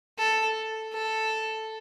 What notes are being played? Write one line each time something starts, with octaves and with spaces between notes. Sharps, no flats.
A4
A4